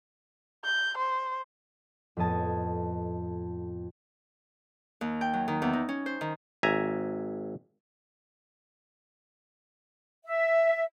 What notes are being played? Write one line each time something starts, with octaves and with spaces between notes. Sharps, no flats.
G6
C5
F2 A2 B3 D#5 A5 G#6
D#2
G5
F#3
D#3
E2
D#4
C#4
C5
D#3
G#1 E5 G#5 A#5
E5